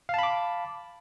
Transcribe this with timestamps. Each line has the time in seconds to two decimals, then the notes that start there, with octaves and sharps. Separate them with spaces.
0.09 F5
0.14 A5
0.19 B5
0.23 D6